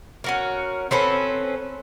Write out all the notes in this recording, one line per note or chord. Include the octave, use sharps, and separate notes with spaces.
C#4 F#4 A#4
C4 C#4 A4 B4